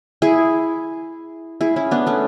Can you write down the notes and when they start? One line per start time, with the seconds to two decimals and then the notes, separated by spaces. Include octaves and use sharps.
0.22 E4 G#4
1.61 E4 G#4
1.76 C#4 E4
1.91 B3 D4
2.07 A3 C#4